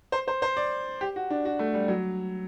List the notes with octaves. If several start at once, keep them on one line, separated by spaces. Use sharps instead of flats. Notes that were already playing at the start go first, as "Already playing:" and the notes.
C5
C5
C5
D5
G4
F#4
D4
F#4
A3
G3
F#3